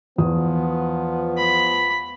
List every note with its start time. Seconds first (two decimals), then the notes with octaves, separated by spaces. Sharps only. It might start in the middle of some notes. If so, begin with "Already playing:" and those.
0.18 E2 F3 B3 D#6
1.38 B5